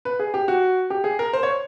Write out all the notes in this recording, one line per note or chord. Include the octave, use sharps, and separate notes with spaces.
B4
G#4
G4
F#4
G4
G#4
A#4
C5
C#5